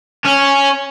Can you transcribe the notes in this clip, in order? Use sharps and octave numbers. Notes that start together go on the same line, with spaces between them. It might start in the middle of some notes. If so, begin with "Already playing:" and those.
C#4